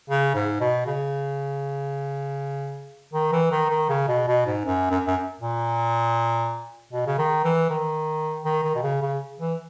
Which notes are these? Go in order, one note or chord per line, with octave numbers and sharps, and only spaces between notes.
C#3
G#2
B2
C#3
D#3
E3
D#3
D#3
C#3
B2
B2
G#2
F#2
F#2
F#2
A#2
B2
C#3
D#3
E3
D#3
D#3
D#3
B2
C#3
C#3
E3